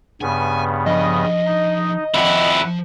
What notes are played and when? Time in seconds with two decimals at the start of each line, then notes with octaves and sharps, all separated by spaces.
0.21 G2 C#3 B3 G#5
0.86 F3 D4 D#5
1.47 D#4 D#5
2.14 F2 F3 E4 C5 F#5